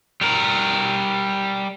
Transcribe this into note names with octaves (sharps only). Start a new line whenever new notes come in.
G3 A#4